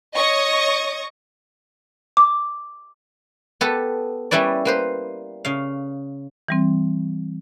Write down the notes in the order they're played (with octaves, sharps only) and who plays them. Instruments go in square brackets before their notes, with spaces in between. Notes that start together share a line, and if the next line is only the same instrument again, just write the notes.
[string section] C#5 D#5 C#6 D#6
[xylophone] D6
[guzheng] B3 G4 A4 B4
G3 C#4 E4 B4 D5
A#3 B4 C5
C#3 F5
[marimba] E3 G3 C4